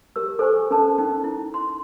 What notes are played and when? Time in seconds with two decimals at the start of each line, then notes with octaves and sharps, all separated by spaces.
0.16 G4 A#4 E6
0.39 A4 C5 G#5 C#6
0.71 C#4 A4 A#4 A5
0.98 C#4 D#4 G5
1.24 E4
1.54 C6